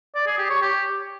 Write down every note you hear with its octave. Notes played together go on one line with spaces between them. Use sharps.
D5
G#4
G4
C#5
G4